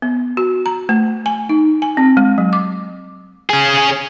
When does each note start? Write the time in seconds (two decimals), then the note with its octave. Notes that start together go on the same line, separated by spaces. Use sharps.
0.02 B3
0.37 F#4
0.66 A#5
0.89 A3
1.26 G#5
1.49 D#4
1.82 G#5
1.97 C4
2.17 G#3
2.38 F#3
2.53 D6
3.50 C#4 G#4